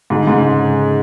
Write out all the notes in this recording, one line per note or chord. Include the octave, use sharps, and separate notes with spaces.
G#2 D3
G#2 C#3
C#3